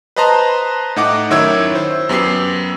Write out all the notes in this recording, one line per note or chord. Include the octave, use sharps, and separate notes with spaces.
B4 C5 D#5 A5 A#5 C6
A2 D#4 F#5 D6
F#2 D#3 E4 C#5 E6 G#6
C5
F#2 B3 G4 E6 C7